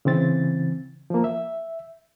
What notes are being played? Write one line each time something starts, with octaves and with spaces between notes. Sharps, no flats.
C#3 E3 C4 A6
F3 A#3
E5